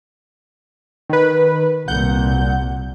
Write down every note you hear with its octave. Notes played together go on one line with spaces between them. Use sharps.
D#3 B4
C2 A#2 F#5 G6